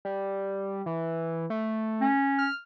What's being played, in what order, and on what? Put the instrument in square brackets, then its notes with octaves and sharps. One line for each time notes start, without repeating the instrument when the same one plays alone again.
[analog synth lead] G3
E3
A3
[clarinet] C#4
[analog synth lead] F6